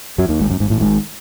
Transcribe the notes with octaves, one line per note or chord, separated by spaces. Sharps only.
F#2 F#3
D#2 D#3
G#1 G#2
F#2
G#1 G#2
A1 A2
G#1 G#2